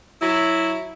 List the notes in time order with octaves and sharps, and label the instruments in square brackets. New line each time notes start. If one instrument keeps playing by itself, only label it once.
[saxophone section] F#3 E4